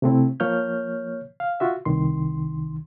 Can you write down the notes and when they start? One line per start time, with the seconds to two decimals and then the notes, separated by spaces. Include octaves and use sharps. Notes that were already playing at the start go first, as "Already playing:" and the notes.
0.02 C3 A3 C4 E4
0.40 F3 A#3 C#5 F6 G6
1.40 F5
1.60 F4 F#4 E5
1.85 C2 D#3 C6